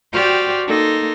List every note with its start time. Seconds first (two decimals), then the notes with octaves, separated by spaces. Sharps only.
0.12 F#4 G4 C5 D5 G5 F6
0.67 A#3 D#4 A4 C6 A#6